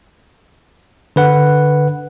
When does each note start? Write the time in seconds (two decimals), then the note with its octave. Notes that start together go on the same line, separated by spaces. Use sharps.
1.16 D3 B4 F#5